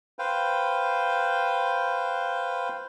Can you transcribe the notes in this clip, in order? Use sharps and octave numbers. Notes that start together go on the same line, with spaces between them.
B4 C5 F5 G5